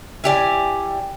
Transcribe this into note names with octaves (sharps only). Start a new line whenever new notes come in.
E4 G4 D5 G#5